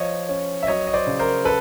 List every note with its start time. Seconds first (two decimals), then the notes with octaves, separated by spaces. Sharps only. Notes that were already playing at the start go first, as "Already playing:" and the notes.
Already playing: F3 C#5 D#5
0.29 C#4
0.63 E5
0.67 F#3 C#5 D#5
0.87 D#5
0.93 C5 D5
1.07 C#3
1.19 A#4 C5
1.45 A4 B4